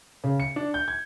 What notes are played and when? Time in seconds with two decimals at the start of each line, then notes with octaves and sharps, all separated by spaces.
0.24 C#3
0.40 C#7
0.56 D4
0.74 G6
0.88 G#6